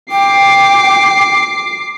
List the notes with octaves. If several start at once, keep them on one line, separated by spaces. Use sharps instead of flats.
G5 D6 C7